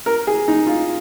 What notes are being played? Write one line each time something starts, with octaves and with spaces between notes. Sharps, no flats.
A#4
G#4
D#4
F4